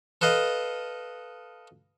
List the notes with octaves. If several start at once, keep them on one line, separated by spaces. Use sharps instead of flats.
A4 B4 D#5 F5